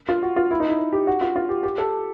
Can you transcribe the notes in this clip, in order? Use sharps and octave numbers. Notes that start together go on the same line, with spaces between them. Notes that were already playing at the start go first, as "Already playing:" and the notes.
F4
F#4
F4
E4
D#4
E4
G4
F#4
F4
F4
G4
G4
A4